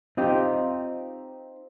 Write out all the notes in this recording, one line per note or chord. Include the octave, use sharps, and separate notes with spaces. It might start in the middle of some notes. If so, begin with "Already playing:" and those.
C4 D#4 F4 G4